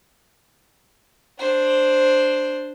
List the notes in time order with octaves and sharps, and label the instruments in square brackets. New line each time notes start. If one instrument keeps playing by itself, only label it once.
[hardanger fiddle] D4 C5